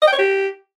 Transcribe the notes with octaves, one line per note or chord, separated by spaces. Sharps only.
D#5
G5
C#5
G4